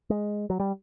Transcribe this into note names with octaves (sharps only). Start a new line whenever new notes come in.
G#3
F#3
G3